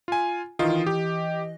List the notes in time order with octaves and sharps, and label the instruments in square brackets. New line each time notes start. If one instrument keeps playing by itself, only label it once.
[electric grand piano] F4 G#5
[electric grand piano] D#3 F4 [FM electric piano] E3 D#5
[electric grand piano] G4